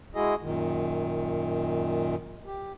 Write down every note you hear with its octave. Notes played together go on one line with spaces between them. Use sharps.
G#3 E4 F#4 G#4 D#5
F#2 A#2 D#3
G4